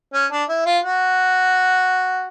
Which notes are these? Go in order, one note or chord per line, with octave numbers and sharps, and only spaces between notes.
C#4
D4
E4
F4
F#4